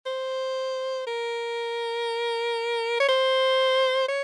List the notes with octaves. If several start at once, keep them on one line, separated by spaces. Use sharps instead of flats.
C5
A#4
C#5
C5
C#5